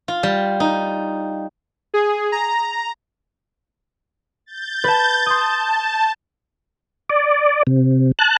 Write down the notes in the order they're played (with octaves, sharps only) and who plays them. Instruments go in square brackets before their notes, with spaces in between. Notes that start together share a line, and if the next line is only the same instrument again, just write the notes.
[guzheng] F4
G3
D#4
[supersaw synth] G#4
A#5
G6 A6
[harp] B4 A5
[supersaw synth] A5 [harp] C6 D#6
[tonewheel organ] D5
C3
A5 F#6